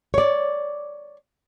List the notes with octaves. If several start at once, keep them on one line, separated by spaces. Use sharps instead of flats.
C#5 D5